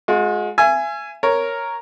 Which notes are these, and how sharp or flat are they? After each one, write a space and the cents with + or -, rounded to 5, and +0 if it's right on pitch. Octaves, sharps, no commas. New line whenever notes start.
G#3 +20 F#4 -45
E5 +40 G#5 +0
A#4 +0 C#5 +0